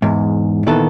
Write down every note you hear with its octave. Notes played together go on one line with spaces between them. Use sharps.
E2 G#2
A#2 D#3 E3 B3 A4